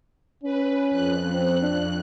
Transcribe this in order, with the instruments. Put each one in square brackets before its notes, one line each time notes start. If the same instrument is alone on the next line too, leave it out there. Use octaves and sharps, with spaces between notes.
[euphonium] C#4 [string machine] B4
[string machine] F2 F#6
[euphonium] C4
D4